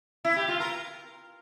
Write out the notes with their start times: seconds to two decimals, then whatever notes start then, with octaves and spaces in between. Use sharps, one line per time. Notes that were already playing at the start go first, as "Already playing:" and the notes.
0.25 E4
0.36 G4
0.48 F4
0.60 A#4